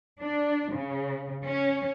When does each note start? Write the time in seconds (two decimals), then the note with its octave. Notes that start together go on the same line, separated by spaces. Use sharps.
0.21 D4
0.73 C#3
1.45 C#4